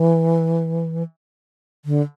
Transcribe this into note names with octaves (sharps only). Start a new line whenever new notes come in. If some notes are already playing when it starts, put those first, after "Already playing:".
Already playing: E3
D3